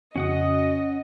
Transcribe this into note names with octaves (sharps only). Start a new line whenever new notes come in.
F2 C#3 C#4 F#4 D#5 F#5 D#6